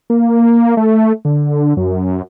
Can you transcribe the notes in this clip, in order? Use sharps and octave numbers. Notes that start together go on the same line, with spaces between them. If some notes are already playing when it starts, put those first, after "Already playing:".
A#3
A3
D3
F#2